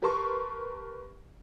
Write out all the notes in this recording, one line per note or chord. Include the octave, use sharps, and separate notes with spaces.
G4 A#4 B4 A5 C6 C#6